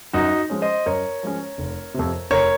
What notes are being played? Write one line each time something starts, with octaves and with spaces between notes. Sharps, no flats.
F#2 D#4 F#4
F3 G#3 C#4
C5 D#5
F#2 A#4 C#5
F3 G#3 C#4
F1
F2 C3
F1 A#4 C#5